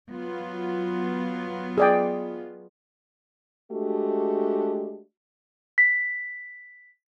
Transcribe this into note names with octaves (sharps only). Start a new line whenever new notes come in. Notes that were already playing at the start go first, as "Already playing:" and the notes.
F#3 B3 F4
G#4 D5 G5
G#3 A3 D4 F#4 G4
B6